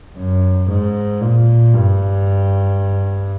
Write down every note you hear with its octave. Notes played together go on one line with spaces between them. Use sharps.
F#2
G#2
A#2
G2